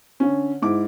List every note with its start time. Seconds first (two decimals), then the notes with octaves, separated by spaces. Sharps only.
0.20 D3 C#4
0.62 G#2 E4 D6